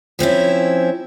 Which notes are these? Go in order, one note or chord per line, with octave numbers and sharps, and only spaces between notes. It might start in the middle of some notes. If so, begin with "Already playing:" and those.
F3 C4 C#4 E4